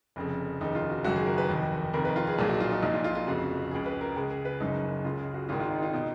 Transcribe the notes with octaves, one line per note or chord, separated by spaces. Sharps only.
F1 F2 C#3
F1 D#2 C#3 D#4
F4
F#4
F#1 F#2 D#3 F#4
G#4
A#4
B4
F1 D#2 D#3
F1 F2 D#3 A#4
B4
F4
G#4
B1 A#2 G#4
F#4
F4
D#4
A#1 A#2 D#4
F4
F4
F4
F1 F2 C#3 F#4
C#2 C#3 G#4
B4
A#4
C#2 C#3 G#4
G#4
B4
F#1 F#2 C#3 D#4
C#2 C#3 F4
G#4
F#4
G#1 G#2 D#3 F4
F4
D#4
F4
B2 D#4